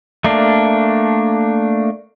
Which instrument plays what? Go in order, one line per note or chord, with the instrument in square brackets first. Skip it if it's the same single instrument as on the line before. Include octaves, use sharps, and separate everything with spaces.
[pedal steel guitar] A3 A#3 D4